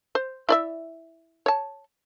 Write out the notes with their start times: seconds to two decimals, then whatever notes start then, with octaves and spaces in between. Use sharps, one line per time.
0.15 C5
0.49 E4 D5 E5
1.46 C#5 A5